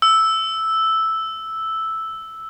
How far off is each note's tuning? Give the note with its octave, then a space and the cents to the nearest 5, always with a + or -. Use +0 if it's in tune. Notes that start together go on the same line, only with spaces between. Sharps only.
E6 -5